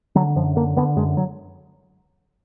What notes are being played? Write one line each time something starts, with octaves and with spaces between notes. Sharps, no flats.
D3 F#3
F#2 F3
D3 A#3
D3 B3
F#2 G#3
F#3